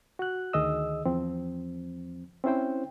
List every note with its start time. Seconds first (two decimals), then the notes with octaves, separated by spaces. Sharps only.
0.19 F#4 F#6
0.53 D2 D#3 G#4 D#5 D#6 E6
1.05 E2 F3 C4
2.44 C4 C#4 E4 C5 G5